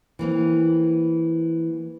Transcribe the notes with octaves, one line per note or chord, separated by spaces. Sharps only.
E3 A#3 C4